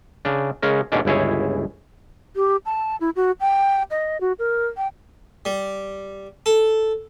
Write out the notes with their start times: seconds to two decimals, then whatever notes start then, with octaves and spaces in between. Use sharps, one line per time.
0.25 C#3 D4
0.63 C#3 G#3 C#4 A#4
0.92 D#2 G#2 B2 C#4 D4
1.05 G1 C#2 E4 G#4 C#5
2.36 G4
2.65 A5
3.00 E4
3.16 F#4
3.40 G5
3.91 D#5
4.21 F#4
4.39 A#4
4.77 G5
5.45 G3
6.46 A4